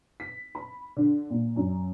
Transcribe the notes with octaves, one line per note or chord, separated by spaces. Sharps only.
B6
B5
D3
A#2
F#2